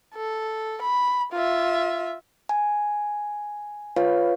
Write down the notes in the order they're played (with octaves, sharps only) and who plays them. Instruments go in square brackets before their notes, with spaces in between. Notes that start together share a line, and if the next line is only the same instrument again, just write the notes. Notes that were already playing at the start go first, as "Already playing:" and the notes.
[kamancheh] A4
B5
F4 E5
[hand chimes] G#5
F4 B4 C#5 F5